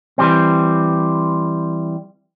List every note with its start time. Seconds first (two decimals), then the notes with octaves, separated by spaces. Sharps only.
0.18 E3 G3 C4